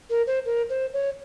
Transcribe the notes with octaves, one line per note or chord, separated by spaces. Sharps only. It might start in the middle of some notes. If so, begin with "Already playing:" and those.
A#4
C5
A#4
C5
C#5